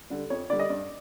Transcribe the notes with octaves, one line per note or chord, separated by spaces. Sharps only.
D3 G3
F2 C#5
D3 G3 D5
D#5
G2 D5